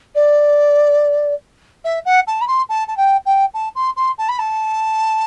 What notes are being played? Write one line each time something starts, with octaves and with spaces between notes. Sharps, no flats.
D5
E5
F#5
A5
B5
C6
A5
A5
G5
G5
A5
C6
C6
A5
B5
A5